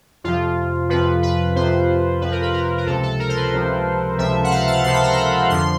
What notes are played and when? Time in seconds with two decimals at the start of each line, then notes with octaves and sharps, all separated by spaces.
0.24 F2 C3 F3 F4
0.89 F2 C3 F3 B4
1.23 B4
1.56 F2 C3 F3 C5
2.21 F2 C3 F3 B4
2.32 A#4
2.42 B4
2.54 A#4
2.78 A#4
2.86 C#2 C3 F3 A4
3.03 A4
3.20 A#4
3.29 C5
3.37 B4
3.53 C#2 C3 F3
4.18 C#2 C3 F3 E5
4.44 F#5
4.51 F5
4.67 A5
4.84 C#2 C3 F3 C6
4.93 B5
5.03 A#5
5.13 B5
5.49 F2 D3 F3 C6